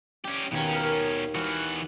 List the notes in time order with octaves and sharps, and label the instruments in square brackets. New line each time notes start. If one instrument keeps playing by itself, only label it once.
[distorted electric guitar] C#4 G4 [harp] D4
[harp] D#2 B3 A#5 [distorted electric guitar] B2 C#4
[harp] A#4 F6 F#6
[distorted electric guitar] E3 F#4 [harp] F6